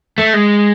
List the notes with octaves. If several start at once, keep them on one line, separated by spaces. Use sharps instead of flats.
A3
G#3